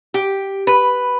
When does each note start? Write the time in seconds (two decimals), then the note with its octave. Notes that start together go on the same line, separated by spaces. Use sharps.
0.14 G4
0.67 B4